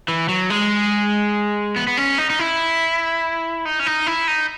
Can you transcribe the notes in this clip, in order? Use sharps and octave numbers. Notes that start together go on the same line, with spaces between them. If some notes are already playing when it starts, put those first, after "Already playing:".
E3
F#3
G#3
B3
B3
C#4
D#4
D#4
E4
D#4
C#4
D#4
E4
D#4